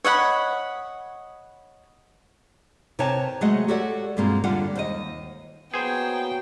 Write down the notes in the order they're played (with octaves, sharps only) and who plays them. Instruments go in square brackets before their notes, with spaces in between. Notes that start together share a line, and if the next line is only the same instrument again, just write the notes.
[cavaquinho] C#5 D#5 F#5 B5
[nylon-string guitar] C3 A#4 B4 C#5 G5 A5
F#3 G#3 A3 F#4 D#5 F#5
F#4 G4 A4 C#5 D5 F#5
G2 B2 G#3 A#3 C4 F4
E2 D3 G3 D4 F4 F#5
D#2 C5 D#5
[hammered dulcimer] F#3 A#3 F#4 [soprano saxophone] B3 [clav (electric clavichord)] G#4 C5 [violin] G5